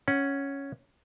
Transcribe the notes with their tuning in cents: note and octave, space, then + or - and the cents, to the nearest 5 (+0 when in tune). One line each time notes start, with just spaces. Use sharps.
C#4 +0 F#5 +0